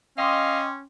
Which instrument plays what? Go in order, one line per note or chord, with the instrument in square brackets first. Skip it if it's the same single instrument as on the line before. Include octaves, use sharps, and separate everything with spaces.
[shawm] C#4 [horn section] D#5 [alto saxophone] F5 [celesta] G5 C6 D6